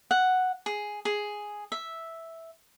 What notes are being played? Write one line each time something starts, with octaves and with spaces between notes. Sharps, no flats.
F#5
G#4
G#4
E5